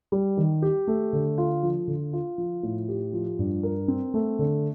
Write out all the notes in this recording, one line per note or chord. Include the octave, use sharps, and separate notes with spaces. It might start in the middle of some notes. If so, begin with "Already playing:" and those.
G3
D#3
G4
A3
D3
F4
F3
D3
F4
F3
A2
G4
F3
G2
A#4
C4
A3
D3